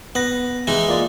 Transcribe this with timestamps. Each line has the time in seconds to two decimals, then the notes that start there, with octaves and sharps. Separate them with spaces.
0.15 B3 B4 A#6
0.67 E3 G#3 D#4
0.88 A#3 F4 D5